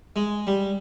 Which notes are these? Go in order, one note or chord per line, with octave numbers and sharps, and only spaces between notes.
G#3
G3